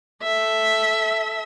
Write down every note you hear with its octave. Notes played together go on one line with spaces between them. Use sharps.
A4 E5